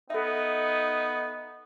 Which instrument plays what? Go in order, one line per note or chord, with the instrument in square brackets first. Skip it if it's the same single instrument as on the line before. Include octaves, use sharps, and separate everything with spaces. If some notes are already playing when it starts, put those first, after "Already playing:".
[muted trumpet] B3 [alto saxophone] D#4 [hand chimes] A4 E5